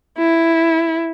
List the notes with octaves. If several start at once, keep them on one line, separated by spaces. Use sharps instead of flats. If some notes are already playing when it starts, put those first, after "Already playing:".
E4